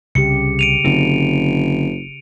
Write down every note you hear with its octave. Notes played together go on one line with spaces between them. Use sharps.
C2 C#3 G4 C#7
D7 D#7 F7
F#1 D3 C4